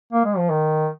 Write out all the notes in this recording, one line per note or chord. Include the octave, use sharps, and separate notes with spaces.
A#3
G#3
F3
D#3